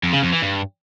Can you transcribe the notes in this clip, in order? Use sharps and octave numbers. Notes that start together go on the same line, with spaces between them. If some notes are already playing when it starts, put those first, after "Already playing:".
F2
C#3
F2
E3
G2